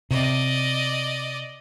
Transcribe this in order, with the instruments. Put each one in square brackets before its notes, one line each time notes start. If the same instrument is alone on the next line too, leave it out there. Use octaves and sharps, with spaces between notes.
[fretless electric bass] C3 [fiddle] D5 D#5